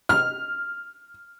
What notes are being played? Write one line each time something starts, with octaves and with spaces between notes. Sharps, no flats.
F6